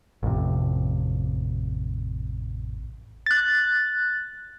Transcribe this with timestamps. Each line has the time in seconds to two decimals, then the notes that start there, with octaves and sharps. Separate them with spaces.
0.23 A1 F2 C3
3.26 F#6 A6